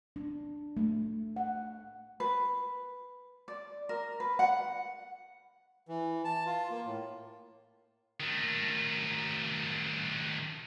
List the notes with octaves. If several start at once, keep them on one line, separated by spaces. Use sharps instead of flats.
D4
A3
F#5
B4
D5
A#4
B4
F#5
E3
A5
F4
A#3
A2
D#3 A3